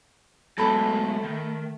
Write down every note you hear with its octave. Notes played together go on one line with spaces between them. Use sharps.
F#3 G#3 A3 B3 A4 B5
D#3